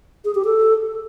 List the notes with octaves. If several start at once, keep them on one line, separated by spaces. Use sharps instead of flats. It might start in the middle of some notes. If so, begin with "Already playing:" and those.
G#4
G4
A4